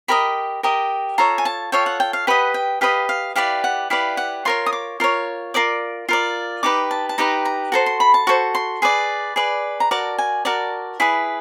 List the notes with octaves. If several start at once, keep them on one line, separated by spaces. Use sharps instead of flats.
G4 A#4 D#5 B5
G4 A#4 D#5
F4 A4 C#5 A#5
G#5
A5
F4 A4 C#5 G5
F#5
G5
F5
G4 B4 D#5 F#5
G5
G4 B4 D#5 F5
F5
E4 G4 B4 D5 F5
F#5
E4 G4 B4 D5 F5
F#5
F4 A#4 C#5 C6
D#6
D6
F4 A#4 C#5
F4 A#4 D5 D6
F4 A#4 D5
D#4 G4 B4 D6
A5
A5
D#4 G4 B4 A#5
A#5
F#4 A4 C5 A#5
C6
B5
A5
F#4 A4 C5 C#6
C6
G#4 B4 D5
G#4 B4 D5
A#5
F#4 A#4 D5 A5
G#5
F#4 A#4 D5 A5
E4 G#4 B4